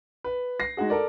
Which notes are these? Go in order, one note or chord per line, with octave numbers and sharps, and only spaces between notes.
B4
A#6 C7
G#3 D#4 F#4 G#4
A4 A#4 D5